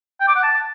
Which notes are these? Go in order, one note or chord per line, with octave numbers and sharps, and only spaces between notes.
G5
D6
F#5
A5